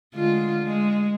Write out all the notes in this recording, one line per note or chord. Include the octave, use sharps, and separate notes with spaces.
D3 G#3 F4
G#3